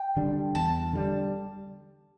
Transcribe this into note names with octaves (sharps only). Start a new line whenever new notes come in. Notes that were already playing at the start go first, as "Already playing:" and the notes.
Already playing: G5
D3 G3 D4
E2 A5
D3 G3 D4